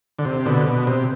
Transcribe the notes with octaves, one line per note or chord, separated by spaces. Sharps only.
D3
C3
B2 D3
B2
C3